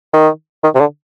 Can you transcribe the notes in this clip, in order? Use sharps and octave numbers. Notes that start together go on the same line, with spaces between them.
D#3
D#3
C3
D3